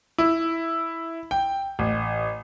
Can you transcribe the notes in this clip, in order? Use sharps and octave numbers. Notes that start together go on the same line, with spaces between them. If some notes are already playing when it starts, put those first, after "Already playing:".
E4
G5
A1